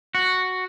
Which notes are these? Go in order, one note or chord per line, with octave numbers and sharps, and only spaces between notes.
F#4